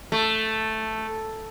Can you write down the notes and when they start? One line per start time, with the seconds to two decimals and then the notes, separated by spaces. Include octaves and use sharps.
0.12 A3